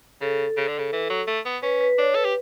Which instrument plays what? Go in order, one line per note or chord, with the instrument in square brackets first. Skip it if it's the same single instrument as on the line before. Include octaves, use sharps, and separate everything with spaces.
[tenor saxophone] C#3 [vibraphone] A4
[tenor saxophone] C#3
D3
C#3
E3
F#3
A3
B3
[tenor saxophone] C#4 [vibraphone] B4
[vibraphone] B4
[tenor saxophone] D4 [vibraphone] C#5
[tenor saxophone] A4 [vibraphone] B4
[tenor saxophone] G4